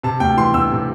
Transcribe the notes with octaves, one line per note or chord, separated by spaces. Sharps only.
C3 A5
D2 G5
E3 C6
D2 E6
C3